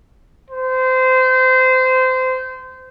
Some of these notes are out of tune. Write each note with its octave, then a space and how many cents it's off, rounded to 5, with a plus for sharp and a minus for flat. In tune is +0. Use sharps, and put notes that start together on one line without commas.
C5 -25